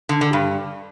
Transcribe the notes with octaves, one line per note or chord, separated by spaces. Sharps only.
D3
D3
G2